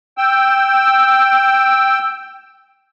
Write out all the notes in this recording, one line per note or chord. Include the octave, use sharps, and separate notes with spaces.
G5 E6